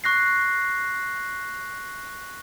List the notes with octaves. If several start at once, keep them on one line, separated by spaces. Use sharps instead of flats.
C#6 F#6 A#6 C7